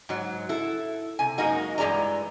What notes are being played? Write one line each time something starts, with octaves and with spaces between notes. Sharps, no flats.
G#2 F#3
E4 A4
C3 G#5
F#2 G#3 A#3 D#4 F#4
G2 E3 G#3 D5 A#5